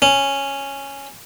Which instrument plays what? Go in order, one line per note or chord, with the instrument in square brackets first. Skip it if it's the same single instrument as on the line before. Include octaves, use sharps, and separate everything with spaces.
[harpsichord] C#4